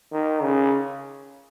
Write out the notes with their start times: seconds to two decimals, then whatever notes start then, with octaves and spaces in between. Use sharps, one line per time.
0.12 D#3
0.42 C#3